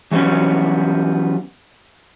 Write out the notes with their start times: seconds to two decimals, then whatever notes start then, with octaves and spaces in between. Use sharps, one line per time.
0.12 E3 F#3 G3 B3 C#4